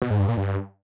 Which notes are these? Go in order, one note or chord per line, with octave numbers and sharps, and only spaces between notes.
B2
G#2
G2
A#2
G2